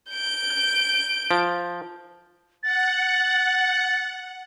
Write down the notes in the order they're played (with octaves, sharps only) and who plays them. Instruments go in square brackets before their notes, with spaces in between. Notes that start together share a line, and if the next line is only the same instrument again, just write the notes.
[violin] G6 D7
[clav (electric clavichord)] F3
[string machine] F#5 [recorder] A6